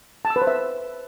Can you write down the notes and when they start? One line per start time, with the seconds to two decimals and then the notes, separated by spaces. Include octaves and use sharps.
0.25 A5
0.30 E6
0.36 B4
0.42 C5
0.47 E5